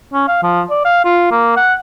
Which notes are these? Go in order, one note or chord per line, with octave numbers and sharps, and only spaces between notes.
C#4
F5
F3
D5
F5
F4
A#3
F#5